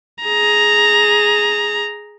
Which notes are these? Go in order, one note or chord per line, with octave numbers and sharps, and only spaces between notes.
G#4 A#5